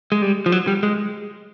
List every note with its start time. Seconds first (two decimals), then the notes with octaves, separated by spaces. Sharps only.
0.12 G#3
0.22 G3
0.46 F3
0.52 F#3
0.67 G3
0.83 G#3